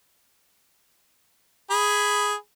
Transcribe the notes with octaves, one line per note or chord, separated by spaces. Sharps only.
G#4 B5